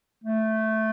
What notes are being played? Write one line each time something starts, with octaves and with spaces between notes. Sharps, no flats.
A3